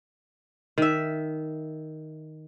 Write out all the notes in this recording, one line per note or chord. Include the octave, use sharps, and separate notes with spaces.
D#3 E5